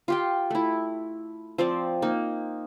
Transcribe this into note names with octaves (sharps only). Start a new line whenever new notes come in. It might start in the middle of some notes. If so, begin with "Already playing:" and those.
F4 G4 G5
A3 E4
F3 C4 D5
A#3 D#4